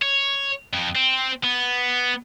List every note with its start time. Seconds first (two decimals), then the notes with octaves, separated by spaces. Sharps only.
0.02 C#5
0.73 F2
0.95 C4
1.44 B3